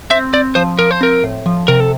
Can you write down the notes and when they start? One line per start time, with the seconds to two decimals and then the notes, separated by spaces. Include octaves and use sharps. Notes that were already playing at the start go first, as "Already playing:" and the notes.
0.10 C4 E5
0.33 C4 D5
0.55 F3 C5
0.79 F3 A#4
0.91 C5
1.01 C4 A#4
1.24 A2
1.46 F3
1.68 C3 A#4
1.80 A4